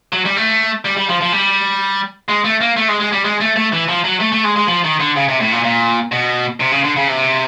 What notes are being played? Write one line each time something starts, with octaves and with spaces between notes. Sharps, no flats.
F#3
G3
A3
G3
G3
F3
F3
G3
G#3
A3
A#3
A3
G#3
G#3
G3
G#3
A3
A3
E3
F3
F#3
A3
A3
G#3
G#3
F3
D#3
D3
C#3
C3
A2
A#2
A#2
B2
C3
C#3
D3
C#3
C3